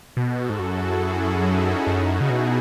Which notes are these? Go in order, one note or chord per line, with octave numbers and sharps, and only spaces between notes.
B2 F#4 A4
G#2
F#2 E4 G#4
C#4 E4
D#4 F#4
E4 G#4
F#2 D#4 F#4
E4 G#4
C#3
B2